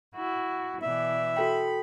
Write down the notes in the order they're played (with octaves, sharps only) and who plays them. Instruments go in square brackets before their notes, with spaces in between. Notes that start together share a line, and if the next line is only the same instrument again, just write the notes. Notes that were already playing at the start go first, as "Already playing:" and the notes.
[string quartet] E4 F#4
[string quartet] B2 E3 D5 [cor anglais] E5
[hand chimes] F#4 A4 G5 [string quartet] B5